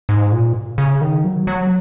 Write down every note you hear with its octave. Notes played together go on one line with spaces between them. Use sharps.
G#2
A#2
C#3
D#3
F#3
F#3